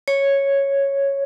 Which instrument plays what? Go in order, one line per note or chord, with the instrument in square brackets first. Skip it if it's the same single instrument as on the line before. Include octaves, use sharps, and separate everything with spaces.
[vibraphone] C#5